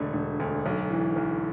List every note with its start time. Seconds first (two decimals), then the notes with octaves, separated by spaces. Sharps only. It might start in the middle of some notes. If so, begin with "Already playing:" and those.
Already playing: E1 D3 A3
0.13 E1
0.40 D2
0.66 B1
0.90 E3
1.16 B1